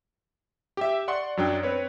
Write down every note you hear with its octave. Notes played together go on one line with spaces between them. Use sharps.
G4 E5
D5 F#5 C6 C#6
F#2 F#3 D4 G5
C4 B4 C#5